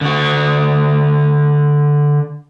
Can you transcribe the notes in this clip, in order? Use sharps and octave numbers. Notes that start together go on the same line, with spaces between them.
D3 F#4